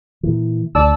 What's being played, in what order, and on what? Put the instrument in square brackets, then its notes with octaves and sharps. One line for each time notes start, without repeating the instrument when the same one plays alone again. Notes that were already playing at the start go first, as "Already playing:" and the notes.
[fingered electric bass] A#2 E3
[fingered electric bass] D2 [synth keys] D5 A5 E6